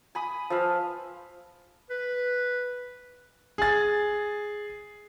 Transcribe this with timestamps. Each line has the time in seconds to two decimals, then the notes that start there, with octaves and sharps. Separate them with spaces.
0.15 G#5 B5 D#6
0.50 F3 B4 E5 F5
1.90 B4
3.58 G#4 A6